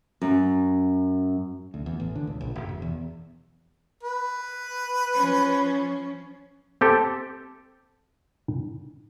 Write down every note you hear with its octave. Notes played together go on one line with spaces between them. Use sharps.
F#2
D2
E2
A1
D3
C#2
A#1
F#1
E1
E2
B4
F3 C#4
C4 G4 A4